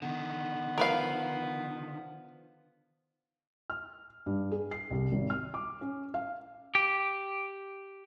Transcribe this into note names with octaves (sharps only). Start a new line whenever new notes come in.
D3 D#3 B3
F3 A#4 B4 F5
F6
G2
G#4
C7
C2
G#1
F6
D6
C#4
F5
G4